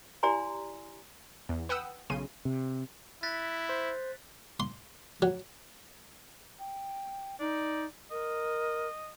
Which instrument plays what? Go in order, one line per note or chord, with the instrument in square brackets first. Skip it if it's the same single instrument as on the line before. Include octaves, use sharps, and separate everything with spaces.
[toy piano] E4 G4 D5 G#5 A#5 C6
[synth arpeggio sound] E2
B4 F#5 G5 D#6 E6
B1 C#3 C6 D#7
[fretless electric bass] C3
[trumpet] E4 [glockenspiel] F#6 A6 B6
[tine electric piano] C5
[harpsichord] C6
F#3
[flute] G5
[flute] D#4 [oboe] D5
[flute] A#4 [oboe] D#5